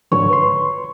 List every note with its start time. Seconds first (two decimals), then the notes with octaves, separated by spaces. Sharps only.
0.12 G#2 D3 F3 C#5
0.30 B4 C6